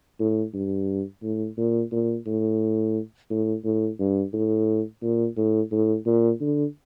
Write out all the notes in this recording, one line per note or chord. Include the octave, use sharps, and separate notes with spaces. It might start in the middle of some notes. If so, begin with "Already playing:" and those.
A2
G2
A2
A#2
A#2
A2
A2
A2
G2
A2
A#2
A2
A2
A#2
D3